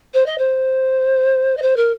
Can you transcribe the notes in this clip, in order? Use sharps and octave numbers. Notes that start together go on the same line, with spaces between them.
C5
D#5
C5
D#5
C5
A#4